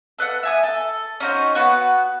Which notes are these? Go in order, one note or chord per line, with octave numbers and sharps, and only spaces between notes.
A4 B4 D#5 F#5
E5 G#5 D#6
A4
C#4 D#4 F#4 C5
B3 F#4 B4